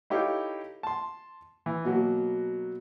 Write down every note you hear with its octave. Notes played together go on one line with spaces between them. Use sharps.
D#4 E4 G4 A4 C#5 F5
A5 C6
E3
B2 F#3 A#3